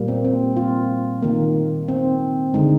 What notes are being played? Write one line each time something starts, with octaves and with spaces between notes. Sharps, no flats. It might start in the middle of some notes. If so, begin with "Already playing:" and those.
Already playing: A#2 G3 A#3
C4
C4
F4
D#3 A#3
C4
D3 G#3 D#4